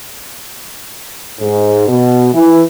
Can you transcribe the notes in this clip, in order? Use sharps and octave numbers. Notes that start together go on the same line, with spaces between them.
G#2
B2
E3